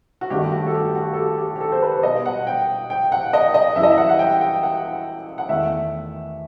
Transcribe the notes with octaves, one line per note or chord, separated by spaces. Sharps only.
F#4
G2 D#3 A3 G4
F#4
A4
G4
F#4
A4
G4
G4
G4
A4
C5
B4
C5
B2 G3 D#5
F#5
G5
G5
F#5
D#5
D#5
F#2 E3 G3 E5
D#5
E5
F#5
F#5
G5
G5
F#5
F#5
E2 D#3 A3 E5